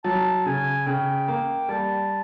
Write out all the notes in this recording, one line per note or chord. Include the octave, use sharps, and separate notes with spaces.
F#3 A5
C#3 G#5
C#3 G5
A#3
G3 A5